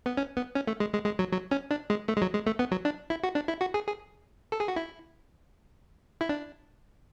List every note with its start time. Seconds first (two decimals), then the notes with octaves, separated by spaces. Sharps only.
0.06 B3
0.17 C#4
0.37 B3
0.55 C#4
0.67 A3
0.80 G#3
0.93 G#3
1.06 G#3
1.19 F#3
1.32 F#3
1.51 C#4
1.71 D4
1.90 G#3
2.08 A3
2.17 G#3
2.22 F#3
2.34 G#3
2.46 A3
2.59 B3
2.71 F#3
2.85 D4
3.10 E4
3.23 F#4
3.35 D4
3.48 E4
3.61 F#4
3.74 G#4
3.87 G#4
4.52 A4
4.60 G#4
4.68 F#4
4.76 E4
6.21 E4
6.29 D4